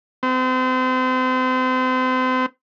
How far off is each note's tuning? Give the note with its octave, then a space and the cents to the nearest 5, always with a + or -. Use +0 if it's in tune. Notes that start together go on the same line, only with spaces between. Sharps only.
C4 -35